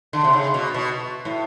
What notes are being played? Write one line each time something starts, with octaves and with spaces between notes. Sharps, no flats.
D3
C3
C#3
B2
B2
A2